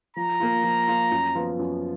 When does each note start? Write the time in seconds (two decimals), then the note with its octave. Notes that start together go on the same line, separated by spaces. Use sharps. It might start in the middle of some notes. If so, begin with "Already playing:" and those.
0.16 F3 A#5
0.40 A#3 F4
0.63 F3
0.88 A#3 F4
1.11 F#2
1.35 F3 B3 F4
1.59 F#2